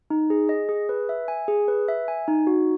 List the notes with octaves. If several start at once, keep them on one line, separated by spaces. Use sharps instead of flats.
D#4
G#4
D#5
G#4
B4
E5
G#5
G#4
B4
E5
G#5
D#4
F#4